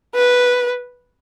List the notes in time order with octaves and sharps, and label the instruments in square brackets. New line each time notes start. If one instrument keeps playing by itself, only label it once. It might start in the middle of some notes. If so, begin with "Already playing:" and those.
[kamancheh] B4